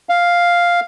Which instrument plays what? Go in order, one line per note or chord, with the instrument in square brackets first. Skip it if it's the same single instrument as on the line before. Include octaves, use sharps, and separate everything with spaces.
[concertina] F5